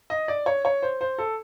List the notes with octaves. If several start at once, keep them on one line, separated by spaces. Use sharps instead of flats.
D#5
D5
C#5
C#5
C5
C5
A4